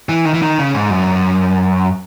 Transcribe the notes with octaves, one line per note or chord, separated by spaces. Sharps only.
E3
D#3
E3
D#3
C#3
G#2
F#2